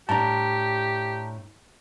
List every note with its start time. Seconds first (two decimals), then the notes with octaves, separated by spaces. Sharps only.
0.09 A2 D4 G4 A5 A#5